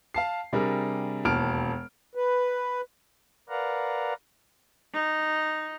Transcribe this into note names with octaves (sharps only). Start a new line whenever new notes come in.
F5 A5 C7
C3 G3 D4 G#4 A#4
E1 D#2 A5 F6 D7
B4
A#4 B4 D5 F5 F#5 A#5
D#4